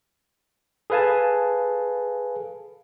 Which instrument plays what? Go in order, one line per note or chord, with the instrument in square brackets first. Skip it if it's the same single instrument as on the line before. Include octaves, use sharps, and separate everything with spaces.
[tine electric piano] G#4 A4 B4 F5 G#5 A5